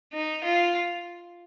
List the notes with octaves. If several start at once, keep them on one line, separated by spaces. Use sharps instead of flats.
D#4
F4